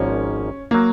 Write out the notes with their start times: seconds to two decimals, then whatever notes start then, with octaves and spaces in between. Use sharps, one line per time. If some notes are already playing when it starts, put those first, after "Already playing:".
Already playing: G#1 G#2 F3 A#3 C#4
0.71 F#3 A#3